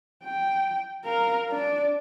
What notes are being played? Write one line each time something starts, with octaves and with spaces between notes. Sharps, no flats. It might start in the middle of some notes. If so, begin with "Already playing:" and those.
G5
A#4 F5
D4 D5